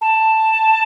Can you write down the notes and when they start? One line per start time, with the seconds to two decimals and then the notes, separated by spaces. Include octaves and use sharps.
0.01 A5